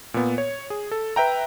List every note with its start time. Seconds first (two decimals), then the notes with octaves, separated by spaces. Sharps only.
0.14 A#2 B3
0.38 C#5
0.70 G#4
0.91 A4
1.16 B4 E5 G5 A#5